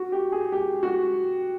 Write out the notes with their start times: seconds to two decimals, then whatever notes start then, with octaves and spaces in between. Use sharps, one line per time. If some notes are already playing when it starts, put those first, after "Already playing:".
Already playing: F#4
0.12 G4
0.32 G#4
0.52 G4
0.83 F#4